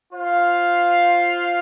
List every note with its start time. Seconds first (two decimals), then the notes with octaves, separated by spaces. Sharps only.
0.14 F4 C5 F5